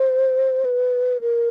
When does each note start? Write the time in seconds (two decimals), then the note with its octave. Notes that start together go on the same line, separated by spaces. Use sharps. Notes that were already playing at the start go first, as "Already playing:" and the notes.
Already playing: C5
0.65 B4
1.21 A#4